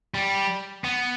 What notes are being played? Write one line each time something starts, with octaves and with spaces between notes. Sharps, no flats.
G3
B3